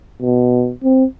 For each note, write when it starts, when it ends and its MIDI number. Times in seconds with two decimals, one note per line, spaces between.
0.22 0.72 47
0.84 1.04 60